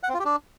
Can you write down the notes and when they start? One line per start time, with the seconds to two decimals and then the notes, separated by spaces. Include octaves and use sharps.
0.03 F#5
0.09 C4
0.14 F4
0.20 G4
0.25 D4